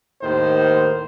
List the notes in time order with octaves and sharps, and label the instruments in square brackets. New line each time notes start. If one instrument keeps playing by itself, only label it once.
[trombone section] D#2 A2 D#3 C5